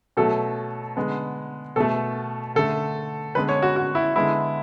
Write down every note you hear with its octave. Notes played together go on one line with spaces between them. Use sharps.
B2 F#3 A3 A4
D3 G#3 B3
B2 A3 A4
D3 A3 A4
D3 G#3 B3 B4
C#5
F#4
F#4
E4
D3 G#3 B3 E4